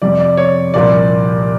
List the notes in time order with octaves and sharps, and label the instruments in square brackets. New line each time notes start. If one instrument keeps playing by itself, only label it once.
[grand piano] F2 C3 F3 D5
D5
C#5
C2 A#2 F3 D5